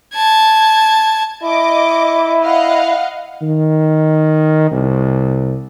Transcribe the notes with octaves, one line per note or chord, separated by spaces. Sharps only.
A5 G#6
E4 D#5 D6
D#5 F5 F#5
D#3
C2